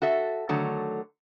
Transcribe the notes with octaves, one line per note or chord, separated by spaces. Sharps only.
F#4 A4 E5
D3 D#3 F#3 A3